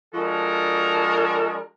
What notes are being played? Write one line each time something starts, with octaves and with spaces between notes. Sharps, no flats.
F3 G#3 D4 F#4 A4 A#4